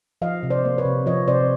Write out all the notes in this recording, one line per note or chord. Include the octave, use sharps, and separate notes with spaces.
F3 D#5 F5
C3
C5 D5
A#3
B4 C#5
C3
F3 C#5 D#5
C3 C5 D5